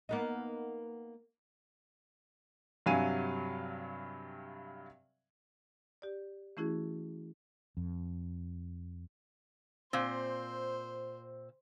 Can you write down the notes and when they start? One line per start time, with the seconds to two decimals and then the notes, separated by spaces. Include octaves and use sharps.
0.09 A#3 B3 D#4
2.86 G2 C3 F#3 F5 G#5 D#7
6.02 G4 D5
6.57 E3 A3 C#4 E4 F#4 G#4
7.77 F2
9.93 A#2 C4 C5